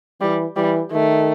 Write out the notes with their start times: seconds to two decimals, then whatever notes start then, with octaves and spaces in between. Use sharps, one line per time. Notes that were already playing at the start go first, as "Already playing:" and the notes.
0.21 E3 G3
0.56 E3 G3
0.92 D#3 A3